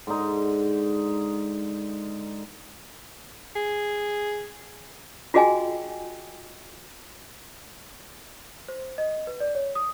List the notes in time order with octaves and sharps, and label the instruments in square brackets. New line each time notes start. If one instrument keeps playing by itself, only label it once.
[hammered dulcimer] G#2 D3 D#4
[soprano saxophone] G#4
[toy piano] F4 F#4 G#4 D#5 G5 G#5
[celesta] C5
D#5
B4
D5
C#5
D#6